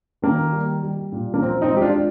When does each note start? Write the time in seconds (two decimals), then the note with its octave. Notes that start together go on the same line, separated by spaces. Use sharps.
0.22 D#3 A#3
0.52 G3
0.83 G3
1.12 A#2
1.34 A#3
1.42 F3 C4
1.62 C4 D#4
1.73 G#3 G4
1.82 D4 F4